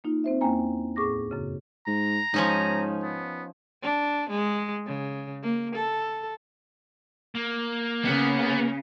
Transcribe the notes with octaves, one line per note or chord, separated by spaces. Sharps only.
A#3 D#4 F4
C4 C5 E5
E2 A#3 C#4 G5 G#5 A#5
D2 A2 G#4 C#6 D6 A#6
F#2 C#3
G#2 A#5
G#2 F3 C#4 D#4
B3
D4
G#3
C#3
A#3
A4
A#3
C#3 B3